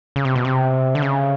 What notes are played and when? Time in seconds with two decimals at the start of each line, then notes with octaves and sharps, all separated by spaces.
0.16 C#3
0.25 C3
0.35 B2
0.45 C3
0.95 D3
1.02 C#3